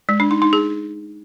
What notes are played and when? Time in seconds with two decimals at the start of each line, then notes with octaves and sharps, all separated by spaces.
0.09 G#3
0.20 D4
0.31 D#4
0.42 D#4
0.53 G#4